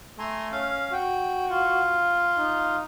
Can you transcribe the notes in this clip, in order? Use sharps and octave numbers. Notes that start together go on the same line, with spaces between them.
A3 G#5 A#5 C6
C#4 F5
F#4 G5
F4
D#4